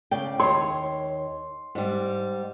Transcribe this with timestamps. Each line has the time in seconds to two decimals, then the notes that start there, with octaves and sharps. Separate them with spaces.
0.11 C#3 D5 G5
0.40 D#2 C#5 C6
1.75 G#2 G3